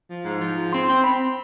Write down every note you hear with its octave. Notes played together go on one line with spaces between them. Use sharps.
F3
G#2
F3
G#2
C4 C6
C4
C4 B5